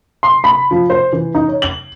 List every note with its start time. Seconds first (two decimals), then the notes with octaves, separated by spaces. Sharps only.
0.23 C6
0.44 B5
0.71 F3
0.90 C5
1.13 E3
1.35 D#4
1.48 C#5
1.62 F#7